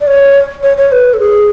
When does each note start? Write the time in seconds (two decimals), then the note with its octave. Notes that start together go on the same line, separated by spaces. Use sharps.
0.01 D5
0.07 C#5
0.63 C#5
0.77 C#5
0.92 B4
1.14 A4
1.20 G#4